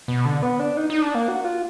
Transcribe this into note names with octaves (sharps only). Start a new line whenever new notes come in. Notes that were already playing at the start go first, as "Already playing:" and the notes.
B2
D3
B3
D4
D#4
D#4
D4
A#3
F#4
F4